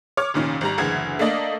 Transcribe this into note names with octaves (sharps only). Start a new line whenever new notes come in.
C#5 D6 F6
F1 A#2 D#3 C#4
G#1 G3 A#5
F#1 D2 E3 G#4 G#6
A3 A#3 D4 D5 D#5 F5